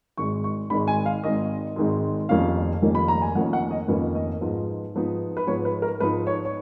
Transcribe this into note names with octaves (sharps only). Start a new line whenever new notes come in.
G#1 G#2 D#3 G#3 C#6
C#6
G#1 G#2 D#3 G#3 B5
G#5
F5
G#1 G#2 D#3 G#3 D#5
G#1 G#2 D#3 G#3
F1 F2 D#3 A#3 C#4 F5
F1 F2 D#3 A#3 C#4
B5
A#5
G#5
F1 F2 D#3 A#3 C#4 F#5
F#5
D#5
F1 F2 D#3 A#3 C#4 B4
D#5
G#2 F3 B3 D#4
G#2 F3 B3 D#4
B4
G#2 F3 B3 D#4 C#5
B4
A#4
G#2 F3 B3 D#4 B4
C#5
C#5